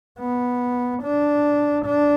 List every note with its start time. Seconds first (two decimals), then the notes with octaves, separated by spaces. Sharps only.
0.19 B3
1.03 D4
1.85 D4